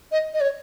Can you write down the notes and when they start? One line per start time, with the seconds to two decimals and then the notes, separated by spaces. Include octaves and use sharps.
0.12 D#5
0.34 D#5
0.41 C#5